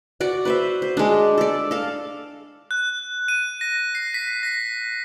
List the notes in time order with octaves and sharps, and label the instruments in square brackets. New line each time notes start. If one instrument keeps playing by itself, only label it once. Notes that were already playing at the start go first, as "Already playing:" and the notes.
[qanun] F#4 D5 F#5
B4 C5 E5
C5
G#3 D4
A4 D5
A4 F5
[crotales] F#6
D#7
A#6
C7
B6
A#6